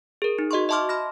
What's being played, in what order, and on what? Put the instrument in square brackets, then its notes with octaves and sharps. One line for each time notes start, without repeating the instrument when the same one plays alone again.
[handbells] G#4 A#4
D#4
F#4 D#5 C6 C#6
D#5 E5 A5 C6 D6 F6
B5 F6 A#6